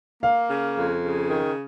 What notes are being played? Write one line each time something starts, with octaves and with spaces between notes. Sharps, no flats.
A#3 F5
C#3
F2
C#3
D#3